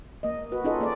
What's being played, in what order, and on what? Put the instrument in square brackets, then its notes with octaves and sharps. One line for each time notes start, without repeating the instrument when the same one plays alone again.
[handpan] A#3 D#5
F#4 B4
C#4 D#4 F4 G#4 A4 D#5
A#3 D5